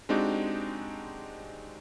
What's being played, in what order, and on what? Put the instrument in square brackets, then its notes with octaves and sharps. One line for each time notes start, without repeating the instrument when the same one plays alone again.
[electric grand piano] G#3 C4 D4 D#4 F#4 G4